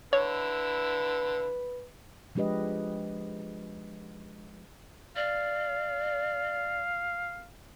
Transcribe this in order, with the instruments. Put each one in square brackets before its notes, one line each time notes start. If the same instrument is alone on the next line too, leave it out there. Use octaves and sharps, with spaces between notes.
[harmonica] D3 E4 [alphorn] B4 [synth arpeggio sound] C#5
[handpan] F3 G#3 D4 G4 B4 D#5
[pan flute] D5 [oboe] F5